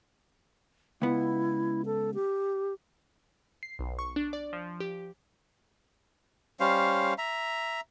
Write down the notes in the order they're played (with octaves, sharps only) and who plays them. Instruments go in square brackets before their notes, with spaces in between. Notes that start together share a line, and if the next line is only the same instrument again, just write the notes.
[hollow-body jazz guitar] C#2 B3 [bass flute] E4
[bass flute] A4
G4
[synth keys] C7
B1
C#6
D4
D5
F3
G4
[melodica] G3 C#4 C5 F5
E5 A#5